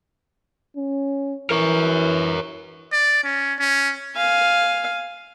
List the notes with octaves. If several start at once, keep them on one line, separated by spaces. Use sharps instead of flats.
C#4
E3 A#4 C#5
D5
C#4
C#4
F5 G#5